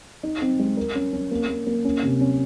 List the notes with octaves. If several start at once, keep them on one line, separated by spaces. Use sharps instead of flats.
D#4
C4
G#3
A#4
C#4
C#4
A#3
A#3
A#3
C#4
C3
C#4